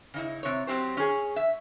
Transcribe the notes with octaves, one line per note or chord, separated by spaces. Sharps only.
C#3 D#4 E4
C3 C#5
F#3 C4 G4 C5
C#4 G#4
E5